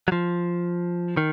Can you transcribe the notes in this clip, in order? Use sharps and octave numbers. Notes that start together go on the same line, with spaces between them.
F#3
F3
D#3